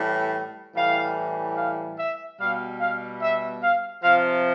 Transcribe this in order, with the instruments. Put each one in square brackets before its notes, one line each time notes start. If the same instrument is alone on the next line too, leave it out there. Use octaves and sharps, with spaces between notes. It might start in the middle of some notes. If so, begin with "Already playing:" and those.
Already playing: [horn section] A2 E3 G3
A2 E3 G3 F5
F5
E5
B2 G3 F5
F5
E5
F5
C3 F3 F5